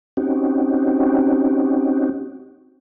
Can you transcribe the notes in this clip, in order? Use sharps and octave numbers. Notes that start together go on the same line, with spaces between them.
C4 C#4 D#4 F#4 G4